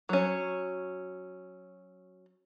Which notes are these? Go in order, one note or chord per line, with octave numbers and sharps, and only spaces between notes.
F#3 C#4